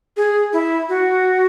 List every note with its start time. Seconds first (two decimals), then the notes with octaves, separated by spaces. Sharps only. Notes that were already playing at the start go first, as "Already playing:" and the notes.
0.17 G#4
0.53 E4
0.89 F#4